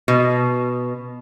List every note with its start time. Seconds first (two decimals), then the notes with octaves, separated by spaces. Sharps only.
0.08 B2